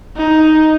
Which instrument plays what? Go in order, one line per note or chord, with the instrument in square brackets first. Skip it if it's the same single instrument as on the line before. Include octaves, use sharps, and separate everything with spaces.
[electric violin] D#4